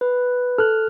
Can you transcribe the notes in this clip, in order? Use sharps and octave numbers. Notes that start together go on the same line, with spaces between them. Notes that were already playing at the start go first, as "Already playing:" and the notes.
B4
A4 F6 F#6